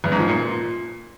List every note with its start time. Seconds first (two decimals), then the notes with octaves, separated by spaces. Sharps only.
0.04 E2
0.12 G#2
0.20 F3
0.28 A#2